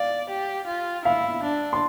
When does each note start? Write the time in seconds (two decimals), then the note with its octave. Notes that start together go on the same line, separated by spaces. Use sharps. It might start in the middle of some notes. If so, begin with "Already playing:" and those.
Already playing: D5 F5
0.29 G4
0.67 F4
1.05 E4 F5
1.43 D4
1.73 C6